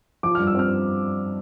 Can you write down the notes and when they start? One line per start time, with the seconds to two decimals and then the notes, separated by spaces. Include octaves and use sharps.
0.23 F3 D6
0.35 G2 F6
0.47 E6
0.55 C4 F6